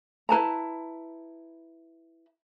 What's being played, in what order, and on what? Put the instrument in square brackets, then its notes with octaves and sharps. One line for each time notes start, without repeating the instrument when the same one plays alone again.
[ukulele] E4 B4 A5 A#5